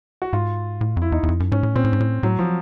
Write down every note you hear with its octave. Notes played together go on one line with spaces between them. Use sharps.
F#4
G#2 F4
A2
F2
E4
E2 D#4
E2
F2
F#2
G#2 C#4
A2
A#2 C4
A2
G#2
A2
A2 F#3
F3